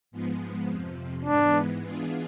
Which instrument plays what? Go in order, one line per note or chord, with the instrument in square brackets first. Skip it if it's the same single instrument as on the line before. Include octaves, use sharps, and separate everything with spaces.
[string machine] G#2 F3 G#3 B3
F2 C3 F3
[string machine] G#2 E3 G#3 B3 [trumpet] D4
[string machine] E3 B3 D4 F4 G#4